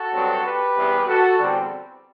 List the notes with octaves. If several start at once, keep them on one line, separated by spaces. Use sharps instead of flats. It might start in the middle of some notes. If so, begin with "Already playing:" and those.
Already playing: F#4 A4
G2 F#3 C4
G4 B4
E2 C3 G3 B3
F#4 A4
E2 D3 G3 C4